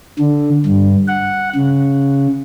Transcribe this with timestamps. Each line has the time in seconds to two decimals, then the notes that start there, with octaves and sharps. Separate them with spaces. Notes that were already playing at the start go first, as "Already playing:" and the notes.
0.19 D3
0.66 G2
1.08 F#5
1.56 C#3